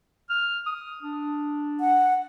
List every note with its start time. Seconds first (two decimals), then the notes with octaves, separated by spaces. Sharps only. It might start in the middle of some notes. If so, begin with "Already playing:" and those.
0.30 F6
0.66 D#6
1.03 D4
1.80 F#5